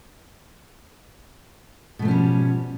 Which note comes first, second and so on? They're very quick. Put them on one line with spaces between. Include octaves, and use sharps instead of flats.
B2 A3 F3 C#4 G3